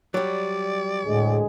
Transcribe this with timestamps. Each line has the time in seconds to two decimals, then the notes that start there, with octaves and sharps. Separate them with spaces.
0.14 F#3 G3 D5
1.05 D2 A2 G#3 G#4